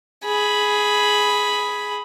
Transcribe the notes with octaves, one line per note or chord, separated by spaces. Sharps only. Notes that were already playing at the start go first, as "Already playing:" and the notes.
G#4 B5